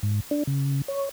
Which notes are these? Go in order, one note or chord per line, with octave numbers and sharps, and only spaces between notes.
G#2
D4
C#3
C#5